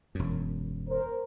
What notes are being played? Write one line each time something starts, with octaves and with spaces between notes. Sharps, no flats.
E1 F#2
A#4 C5